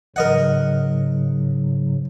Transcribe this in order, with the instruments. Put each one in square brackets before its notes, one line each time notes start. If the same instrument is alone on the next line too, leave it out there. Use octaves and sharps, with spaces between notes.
[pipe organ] G#2 C#3 F#3 [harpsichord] A#4 D#5 F#5